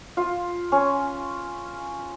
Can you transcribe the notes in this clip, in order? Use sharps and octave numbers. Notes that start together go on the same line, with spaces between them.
F4
C#4